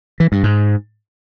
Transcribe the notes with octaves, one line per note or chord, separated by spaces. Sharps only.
E3
G2
G#2